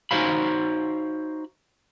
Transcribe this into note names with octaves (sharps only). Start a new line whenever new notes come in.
D#4 F#4 C5 C#5 F5 B5